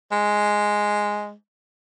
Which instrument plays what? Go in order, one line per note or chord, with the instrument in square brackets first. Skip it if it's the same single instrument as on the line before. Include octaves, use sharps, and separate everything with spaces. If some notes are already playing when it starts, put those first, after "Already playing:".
[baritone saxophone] G#3